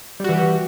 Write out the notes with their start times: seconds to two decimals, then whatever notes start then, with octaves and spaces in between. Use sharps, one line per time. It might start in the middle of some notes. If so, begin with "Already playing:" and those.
0.20 G3
0.24 F#4
0.29 E3
0.33 G4